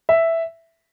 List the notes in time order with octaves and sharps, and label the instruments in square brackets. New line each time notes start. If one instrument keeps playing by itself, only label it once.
[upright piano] E5